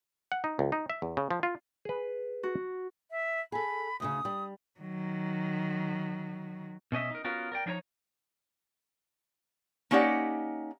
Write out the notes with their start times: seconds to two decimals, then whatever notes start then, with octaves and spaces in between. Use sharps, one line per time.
0.32 F#5
0.44 D#4
0.59 C#2
0.72 D#4
0.90 E5
1.02 E2
1.17 C#3
1.31 F3
1.43 F4
1.85 G#4 B4
2.43 F#4
3.11 E5
3.52 G#4 A4 B5
4.00 D2 A2 C#3 D#6
4.25 G3
4.80 D#3 F#3
6.92 B2 C#4 D#5 E5
7.11 D#4 A#4
7.24 B3 C#4 F4 F#4 A#4
7.52 A#4 D5 G5
7.66 F3 D4 D#4 C#5 A#5
9.91 A#3 C#4 D#4 G4 D5 F#5